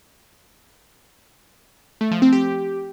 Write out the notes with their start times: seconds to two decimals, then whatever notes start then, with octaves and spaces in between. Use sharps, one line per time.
2.01 A3
2.11 F3
2.22 C4
2.32 G4